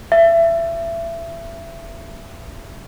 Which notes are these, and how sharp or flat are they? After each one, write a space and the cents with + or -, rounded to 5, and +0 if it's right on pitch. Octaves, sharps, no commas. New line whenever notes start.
E5 +25